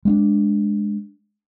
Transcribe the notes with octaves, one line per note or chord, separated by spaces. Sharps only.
G#3 C4 D4